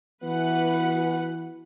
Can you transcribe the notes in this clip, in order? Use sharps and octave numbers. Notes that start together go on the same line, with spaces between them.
E3 B3 F#4 B4 F#5